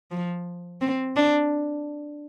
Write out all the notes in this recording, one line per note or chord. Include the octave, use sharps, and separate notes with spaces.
F3
C4
D4